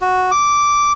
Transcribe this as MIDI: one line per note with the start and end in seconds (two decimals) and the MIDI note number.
0.01 0.31 66
0.31 0.92 86